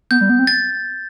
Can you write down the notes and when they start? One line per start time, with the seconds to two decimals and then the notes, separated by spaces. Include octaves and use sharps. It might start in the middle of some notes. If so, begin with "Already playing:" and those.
0.11 B3 G6
0.21 G3
0.30 B3
0.39 C4
0.47 A6